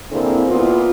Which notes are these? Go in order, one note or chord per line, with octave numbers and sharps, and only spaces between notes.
D3 A#3 C4 E4 G#4
A#2 B3 E4 F4